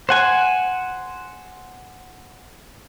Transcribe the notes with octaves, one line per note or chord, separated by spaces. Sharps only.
C5 F#5 G#5